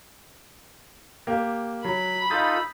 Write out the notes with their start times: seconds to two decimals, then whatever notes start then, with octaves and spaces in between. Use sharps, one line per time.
1.27 A#3 G4
1.85 F#3 B5
2.30 D#4 F4 A4 D#6 G6 A6